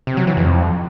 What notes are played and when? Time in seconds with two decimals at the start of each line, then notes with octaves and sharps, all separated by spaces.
0.07 C3
0.17 F#3
0.27 E3
0.37 F2